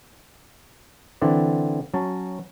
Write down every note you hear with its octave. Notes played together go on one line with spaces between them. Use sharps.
D3 E3 C4 D5
F#3 C#4 A5